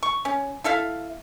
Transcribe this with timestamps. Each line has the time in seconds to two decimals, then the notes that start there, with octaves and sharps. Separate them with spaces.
0.03 C#6
0.25 C#4
0.64 E4 A4 E5 F5